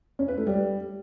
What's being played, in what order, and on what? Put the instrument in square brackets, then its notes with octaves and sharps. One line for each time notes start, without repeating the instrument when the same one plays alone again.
[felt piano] C#4
B4
A3
G3